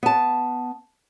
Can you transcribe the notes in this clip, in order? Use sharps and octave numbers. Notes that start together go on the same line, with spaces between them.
B3 A5